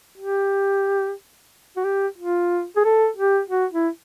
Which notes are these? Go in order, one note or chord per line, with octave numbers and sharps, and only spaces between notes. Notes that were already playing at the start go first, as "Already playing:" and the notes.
G4
F#4
G4
F4
G#4
A4
G4
F#4
E4